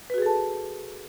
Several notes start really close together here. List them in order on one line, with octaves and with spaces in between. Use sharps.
B4 F#4 G#4 A4 A5